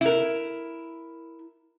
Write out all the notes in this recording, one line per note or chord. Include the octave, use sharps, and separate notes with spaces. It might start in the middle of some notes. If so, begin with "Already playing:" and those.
E4 A#4